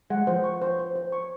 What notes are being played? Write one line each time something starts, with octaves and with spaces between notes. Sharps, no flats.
G#3 F#5
F3 C5
C#6
C5
C5
C5
C#6